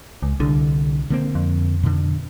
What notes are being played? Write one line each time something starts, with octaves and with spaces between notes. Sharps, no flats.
C#2
C2 D3
D3 A#3 C4
F2
B2 D3